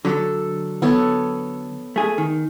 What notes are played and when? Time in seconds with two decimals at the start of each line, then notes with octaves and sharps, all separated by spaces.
0.05 D3 F#3 A4
0.82 B3 A4 C#5
1.96 A3 G#4
2.18 D#3